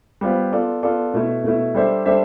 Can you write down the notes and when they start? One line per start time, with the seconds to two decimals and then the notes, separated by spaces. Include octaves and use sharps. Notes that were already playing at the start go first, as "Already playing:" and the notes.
0.21 G3 B3 F4 C5
0.52 B3 F4 A4 D5
0.83 B3 F4 A4 D5
1.14 B2 A3 E4
1.44 B2 A3 E4
1.74 G3 D4 A4 C5 E5
2.05 G3 D4 A4 C5 E5